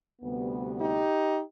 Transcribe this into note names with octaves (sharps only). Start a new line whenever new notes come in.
D2 C3 G3 B3
D#4 G4